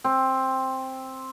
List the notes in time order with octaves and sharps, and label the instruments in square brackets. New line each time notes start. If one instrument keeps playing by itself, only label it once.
[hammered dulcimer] C4